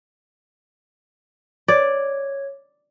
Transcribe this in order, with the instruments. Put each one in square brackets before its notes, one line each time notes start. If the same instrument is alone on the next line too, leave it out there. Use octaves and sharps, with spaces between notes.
[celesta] C#5 G#6 [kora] D5